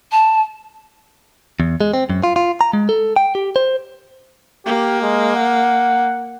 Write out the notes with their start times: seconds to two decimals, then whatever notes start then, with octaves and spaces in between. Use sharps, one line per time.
0.11 A5
1.60 E2
1.81 G#3
1.94 C4
2.10 F#2
2.24 F4
2.36 F4
2.61 A#5
2.73 G#3
2.89 A4
3.16 G5
3.35 G4
3.56 C5
4.66 A#3 G4
5.02 G#3
5.36 F#5